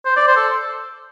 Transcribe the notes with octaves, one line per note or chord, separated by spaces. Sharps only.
C5
D5
C5
A4